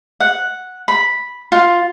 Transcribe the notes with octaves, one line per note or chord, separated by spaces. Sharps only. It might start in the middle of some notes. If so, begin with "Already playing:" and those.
F#5
B5
F4